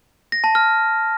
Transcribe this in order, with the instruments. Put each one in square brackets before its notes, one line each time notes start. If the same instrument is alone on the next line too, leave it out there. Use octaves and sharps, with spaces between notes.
[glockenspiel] A#6
A5
F6